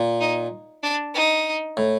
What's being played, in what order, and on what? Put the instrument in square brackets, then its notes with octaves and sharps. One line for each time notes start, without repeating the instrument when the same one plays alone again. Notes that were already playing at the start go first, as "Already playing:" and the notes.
Already playing: [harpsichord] A#2
[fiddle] D#4
D4
D#4
[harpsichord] A2